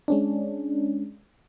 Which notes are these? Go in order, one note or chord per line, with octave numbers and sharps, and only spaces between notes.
G#3 C#4 D4